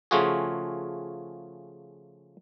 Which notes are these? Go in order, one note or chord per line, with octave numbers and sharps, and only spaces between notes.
C#3 F3 A3 F4 F#4 G#4